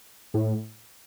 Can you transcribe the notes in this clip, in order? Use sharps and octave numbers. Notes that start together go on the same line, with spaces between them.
A2